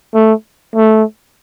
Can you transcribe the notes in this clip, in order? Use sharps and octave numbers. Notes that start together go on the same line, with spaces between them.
A3
A3